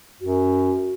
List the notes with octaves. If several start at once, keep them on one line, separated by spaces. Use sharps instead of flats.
F#2 F#4